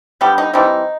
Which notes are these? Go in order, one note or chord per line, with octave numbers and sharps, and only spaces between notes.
D3 G3 B3 G4
D#4
E3 G3 C4 D#4